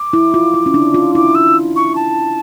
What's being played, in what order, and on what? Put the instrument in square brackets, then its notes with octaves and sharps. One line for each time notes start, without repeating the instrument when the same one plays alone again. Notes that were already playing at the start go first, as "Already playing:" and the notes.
Already playing: [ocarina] D6
[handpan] E4
F4
F4
C#4
D4
F4
[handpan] E4 [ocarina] D6
[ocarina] E6
C#6
A5